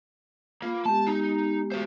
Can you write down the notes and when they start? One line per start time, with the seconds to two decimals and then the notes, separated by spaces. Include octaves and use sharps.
0.62 A#3 F4 B5
0.86 G#3 B3 G4 A5
1.07 D#4
1.72 F#4 C5